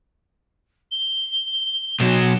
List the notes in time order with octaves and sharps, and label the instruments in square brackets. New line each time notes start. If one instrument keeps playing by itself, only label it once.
[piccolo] G7
[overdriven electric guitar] B2 F#3 [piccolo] E7